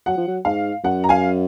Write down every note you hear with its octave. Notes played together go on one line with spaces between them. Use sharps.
F#3 F#5
F3
F#3
G#2 F5
F#2 F#5
A#5
F5 G#5